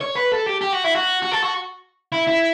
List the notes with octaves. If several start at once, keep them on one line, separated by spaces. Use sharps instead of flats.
C#5
B4
A4
G4
G4
F#4
E4
F#4
F#4
A4
F#4
E4
E4